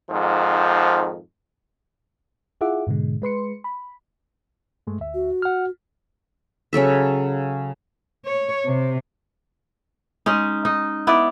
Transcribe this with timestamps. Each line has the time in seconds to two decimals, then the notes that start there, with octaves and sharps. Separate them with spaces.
0.11 F2 G#2 D#3 F3
2.61 E4 F4 G#4 E5 F#5 D6
2.87 G#2 B2 D3 G#3
3.22 G#3 B4 C6 C#7
3.64 B5
4.87 G2 G#3 A3
4.99 D2 E5
5.14 F#4
5.42 F#5 F6
6.73 C#3 F#3 A4 E5
8.25 C#5
8.66 C3
10.26 G#3 C#4 D#4
10.65 D#4
11.07 B3 E4 D5